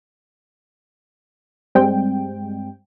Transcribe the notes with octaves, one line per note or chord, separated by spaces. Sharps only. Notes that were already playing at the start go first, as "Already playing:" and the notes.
G2 G3 G#3 C4 G5